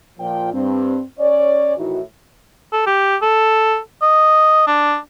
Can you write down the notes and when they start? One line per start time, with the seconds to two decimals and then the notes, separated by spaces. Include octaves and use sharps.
0.19 A#2 F3 F4 G5
0.53 G2 C4
1.19 C#4 C#5 D5
1.78 A2 D#3 E3 D#4 E4 F#4
2.72 A4
2.86 G4
3.22 A4
4.02 D#5
4.67 D4